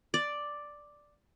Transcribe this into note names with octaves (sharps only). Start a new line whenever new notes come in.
D5